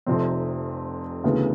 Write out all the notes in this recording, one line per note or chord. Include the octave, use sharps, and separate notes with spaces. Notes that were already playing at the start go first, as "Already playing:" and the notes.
F1 F2 C3 C4
D2 C#3 E3 B3